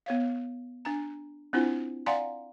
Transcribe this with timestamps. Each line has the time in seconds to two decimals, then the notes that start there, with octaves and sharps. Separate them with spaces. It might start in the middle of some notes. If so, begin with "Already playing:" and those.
0.06 B3 C#5 F5
0.85 D4 A#5
1.53 C4 D4 E4 F4 C5
2.06 D5 F5 F#5 G#5 A#5 C6